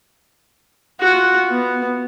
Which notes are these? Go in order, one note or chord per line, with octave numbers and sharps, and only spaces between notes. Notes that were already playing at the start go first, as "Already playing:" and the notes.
F4 F#4
B3